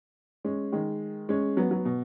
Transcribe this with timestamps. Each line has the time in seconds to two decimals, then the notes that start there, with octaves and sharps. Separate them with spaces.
0.45 G#3 C#4
0.72 D#3 G#3
1.29 G#3 C#4
1.57 F#3 B3
1.71 F#3 B3
1.85 B2